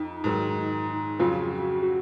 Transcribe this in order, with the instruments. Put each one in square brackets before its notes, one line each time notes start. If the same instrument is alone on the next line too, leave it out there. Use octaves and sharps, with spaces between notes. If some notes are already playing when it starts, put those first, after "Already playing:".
Already playing: [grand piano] F2 [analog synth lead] D#4
[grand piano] G#2 D#3 F#3
[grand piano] F2 C#3 F#3 [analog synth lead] F4
[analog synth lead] F#4
F#4